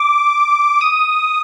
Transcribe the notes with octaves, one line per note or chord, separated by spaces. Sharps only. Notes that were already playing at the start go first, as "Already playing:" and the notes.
Already playing: D6
D#6